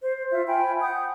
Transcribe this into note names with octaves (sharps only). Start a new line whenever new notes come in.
C5
F4 E5
G5 G#5 B5
F#5 D#6 G6